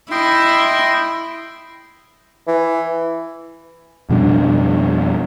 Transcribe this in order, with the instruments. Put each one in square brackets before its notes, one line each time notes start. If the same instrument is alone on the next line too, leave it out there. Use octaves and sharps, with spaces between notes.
[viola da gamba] E4 [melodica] D#5 G5 C6
[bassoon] E3
[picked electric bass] F2 B2 G3 D4